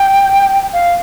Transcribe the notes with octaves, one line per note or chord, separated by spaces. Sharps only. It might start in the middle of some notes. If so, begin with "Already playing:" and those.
Already playing: G5
F5